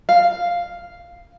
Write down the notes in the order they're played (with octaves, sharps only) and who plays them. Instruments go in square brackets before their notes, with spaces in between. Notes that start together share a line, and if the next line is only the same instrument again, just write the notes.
[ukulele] F5